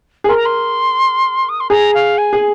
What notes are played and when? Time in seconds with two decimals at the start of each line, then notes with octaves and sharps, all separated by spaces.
0.24 G#4
0.29 A#4 C6
0.37 A#5
0.45 C6
1.49 D#6
1.60 C6
1.70 G#4 A#5
1.94 F5
2.17 G#5
2.33 G#4